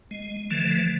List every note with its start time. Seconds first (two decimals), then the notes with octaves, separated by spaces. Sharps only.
0.11 G#3
0.51 D3 E3 F3 A3